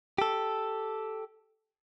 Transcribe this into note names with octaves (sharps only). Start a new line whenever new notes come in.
G4 A4